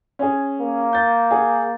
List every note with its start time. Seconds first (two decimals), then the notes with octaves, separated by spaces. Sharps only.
0.19 C#4 G#4
0.61 A#3
0.93 G6 A6
1.31 G#4 F#5